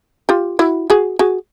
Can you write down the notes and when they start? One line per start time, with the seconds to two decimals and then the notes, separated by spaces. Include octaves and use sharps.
0.29 F4 G4
0.59 E4 F#4
0.90 F#4 G#4
1.19 F#4 G#4